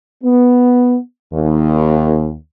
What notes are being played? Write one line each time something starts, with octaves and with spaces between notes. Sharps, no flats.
B3
D#2